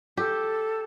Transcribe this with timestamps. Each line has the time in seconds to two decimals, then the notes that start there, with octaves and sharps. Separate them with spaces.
0.17 G4 A4